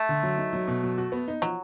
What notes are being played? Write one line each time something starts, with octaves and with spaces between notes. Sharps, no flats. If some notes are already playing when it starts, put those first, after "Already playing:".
Already playing: A3
D3
F#3
D#4
F#3
B2
F#3
F#4
B3
D#4
F3 F#3